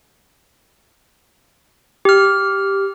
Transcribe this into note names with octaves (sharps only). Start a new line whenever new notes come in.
G4 F6